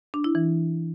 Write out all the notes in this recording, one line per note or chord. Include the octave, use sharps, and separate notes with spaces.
D4
E4
E3